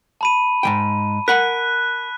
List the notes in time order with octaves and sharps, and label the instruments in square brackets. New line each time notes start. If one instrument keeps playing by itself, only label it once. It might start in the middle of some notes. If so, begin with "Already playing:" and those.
[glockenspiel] A5 B5 D#7
[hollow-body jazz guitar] G#2 E3 G5
[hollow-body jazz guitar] A#4 F#5 B5 [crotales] F#6 [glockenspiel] B6